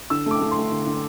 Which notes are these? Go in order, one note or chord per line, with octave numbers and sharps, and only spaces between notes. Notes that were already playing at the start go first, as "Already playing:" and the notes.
D3 E6
A3 D6
A3
C6
A3
D3
D3